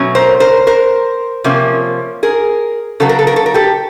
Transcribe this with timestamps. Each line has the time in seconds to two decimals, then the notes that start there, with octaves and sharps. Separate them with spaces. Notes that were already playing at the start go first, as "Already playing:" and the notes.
Already playing: B2 F#3 A3 C#4
0.15 A#4 C5
0.40 A#4 C5
0.67 A#4 C5
1.44 C3 F3 A#3 C#4
2.23 G#4 A#4
3.00 C#3 F#3 B3 A4
3.09 A#4
3.19 A4
3.27 A#4
3.36 A4
3.46 A#4
3.54 G4 A4